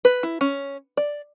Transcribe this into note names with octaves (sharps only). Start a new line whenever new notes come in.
B4
E4
C#4
D5